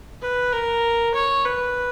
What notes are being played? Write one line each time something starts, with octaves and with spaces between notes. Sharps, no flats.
B4
A#4
C#5
B4